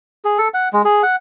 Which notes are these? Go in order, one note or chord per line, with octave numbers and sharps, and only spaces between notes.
G#4
A4
F#5
G#3
G#4
F#5